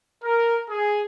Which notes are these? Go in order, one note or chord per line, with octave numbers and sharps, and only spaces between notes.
A#4
G#4